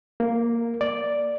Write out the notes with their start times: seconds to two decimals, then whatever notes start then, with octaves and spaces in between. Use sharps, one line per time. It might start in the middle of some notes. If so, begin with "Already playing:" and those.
0.20 A#3
0.81 D5